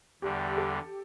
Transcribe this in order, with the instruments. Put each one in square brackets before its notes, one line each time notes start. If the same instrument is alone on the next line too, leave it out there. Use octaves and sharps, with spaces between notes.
[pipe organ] E2 D3 G3 [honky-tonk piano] G4
[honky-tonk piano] A4